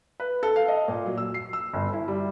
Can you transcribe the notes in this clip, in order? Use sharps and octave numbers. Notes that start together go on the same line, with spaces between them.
B4
A4
F5
D#5
A#2
F#3
E6
C7
E6
G1
E4
G3